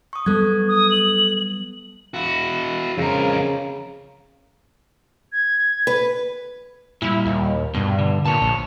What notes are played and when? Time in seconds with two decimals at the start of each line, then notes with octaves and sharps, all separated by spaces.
0.13 C#6 D#6
0.26 F#3 G3 B3 A4 F#6 G#6
0.68 D#6
0.91 F#7
2.14 E4 F#4
2.97 F2 C#3 A#4
5.32 G#6
5.87 B4
7.02 A#2 G3 E4
7.26 D#2
7.75 G2 B2
7.98 D3
8.25 A#2 C#5 A5
8.42 A#1